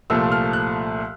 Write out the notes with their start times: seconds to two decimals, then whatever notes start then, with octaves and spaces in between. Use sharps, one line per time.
0.10 C2 A#2 F3 A3 E6
0.32 F6
0.53 F#6